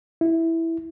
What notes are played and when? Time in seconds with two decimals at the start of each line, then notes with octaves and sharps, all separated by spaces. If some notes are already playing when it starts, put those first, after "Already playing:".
0.21 E4